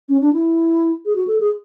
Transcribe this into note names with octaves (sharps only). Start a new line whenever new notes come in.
C#4
D4
E4
G#4
F#4
A4
G#4